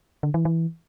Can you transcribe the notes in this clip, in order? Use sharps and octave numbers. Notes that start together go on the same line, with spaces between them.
D3
E3
E3